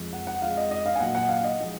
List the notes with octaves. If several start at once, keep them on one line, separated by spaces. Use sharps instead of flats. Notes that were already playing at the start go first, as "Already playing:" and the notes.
Already playing: F2 F3 G#3
F#5
F#5
F2 F3 G#3 F5
D#5
D#5
F5
G#5
A#2 F#3 F#5
F#5
F5
D#5
F3 G#3